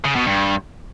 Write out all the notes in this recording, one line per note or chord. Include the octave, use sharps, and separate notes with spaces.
C#3
B2
G2